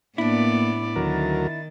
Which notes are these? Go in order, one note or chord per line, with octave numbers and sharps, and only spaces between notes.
A2 A#3 B3 D4 E4 D5
D2 D#3 F#3 A#4 A6